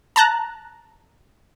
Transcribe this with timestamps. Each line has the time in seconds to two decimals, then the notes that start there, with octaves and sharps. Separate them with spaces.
0.16 A5 A#5 F#6